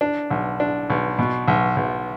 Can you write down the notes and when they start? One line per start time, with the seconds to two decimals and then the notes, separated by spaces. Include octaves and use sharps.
0.01 D4
0.30 B1
0.60 D4
0.90 B1
1.19 B2
1.48 B1
1.76 B1